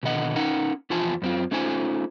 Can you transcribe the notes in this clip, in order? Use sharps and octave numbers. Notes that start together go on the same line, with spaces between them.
B2 D3 D#3 D#5 F#5
C#4 D#4 A#4 F#5
E2 F3 F4 C5 G#5 A5
F#2 C4 F4
A3 C#4 D#4 F4 C5 G#5